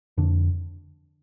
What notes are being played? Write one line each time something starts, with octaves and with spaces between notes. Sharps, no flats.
F2 D3 D4